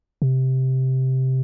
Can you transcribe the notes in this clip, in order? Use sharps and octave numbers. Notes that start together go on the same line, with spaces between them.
C3